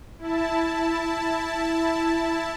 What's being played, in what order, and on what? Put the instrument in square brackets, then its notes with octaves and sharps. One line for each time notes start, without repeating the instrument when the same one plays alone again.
[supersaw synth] E4 A5